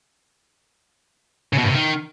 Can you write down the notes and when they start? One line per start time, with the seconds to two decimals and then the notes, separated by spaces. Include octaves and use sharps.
1.53 C#3
1.58 B2
1.63 G2
1.69 C3
1.74 D#3